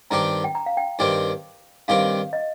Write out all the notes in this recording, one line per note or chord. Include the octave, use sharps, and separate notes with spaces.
G2 D#3 C4 G4 A#5
G5
A#5
F5
G5
G2 D#3 C4 G4
G2 D#3 C4 G4 F5
D#5